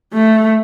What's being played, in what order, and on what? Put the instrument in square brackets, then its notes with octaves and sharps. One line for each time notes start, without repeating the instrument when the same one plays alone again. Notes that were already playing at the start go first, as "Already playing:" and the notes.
[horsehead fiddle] A3